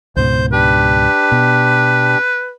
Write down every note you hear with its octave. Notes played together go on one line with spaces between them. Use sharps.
C#2 G#2 B2 C5 G6
D4 G4 B4
B2